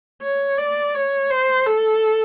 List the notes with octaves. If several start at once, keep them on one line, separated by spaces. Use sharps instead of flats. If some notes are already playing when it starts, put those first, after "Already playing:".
C#5
D5
C#5
C5
A4